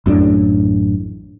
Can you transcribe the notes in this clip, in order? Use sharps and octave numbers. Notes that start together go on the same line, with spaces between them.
A1 F#2 A2 D4